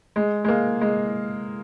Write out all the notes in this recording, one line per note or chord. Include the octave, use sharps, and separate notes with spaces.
G#3
G#3
A#3
G#3